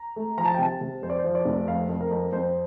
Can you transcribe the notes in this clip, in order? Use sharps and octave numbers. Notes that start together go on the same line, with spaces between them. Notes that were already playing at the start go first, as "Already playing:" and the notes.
Already playing: A#5
A3
F3 A#5
A5
G5
C3 A5
C3
F2 C5
D5
C5
F3
D5
F1
F2 F5
F2
A#4
F2
F2 C5